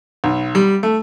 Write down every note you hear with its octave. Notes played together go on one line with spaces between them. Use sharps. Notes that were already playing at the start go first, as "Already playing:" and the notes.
B1
G3
A3